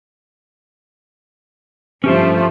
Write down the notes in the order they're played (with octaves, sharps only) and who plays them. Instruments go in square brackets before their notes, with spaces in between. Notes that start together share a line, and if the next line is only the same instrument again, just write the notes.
[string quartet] G2 F3 A3 [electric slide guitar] C#4 G4 C5